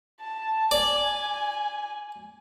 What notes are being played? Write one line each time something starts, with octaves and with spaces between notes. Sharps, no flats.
A5
D5 G#5